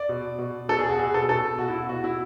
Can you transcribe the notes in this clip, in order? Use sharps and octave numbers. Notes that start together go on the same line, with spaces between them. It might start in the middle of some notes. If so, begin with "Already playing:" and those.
Already playing: D5
B2
B2
B2 A4
G#4
F#4
B2 G#4
A4
B2 A4
B2 F#4
E4
F#4
B2 F#4
E4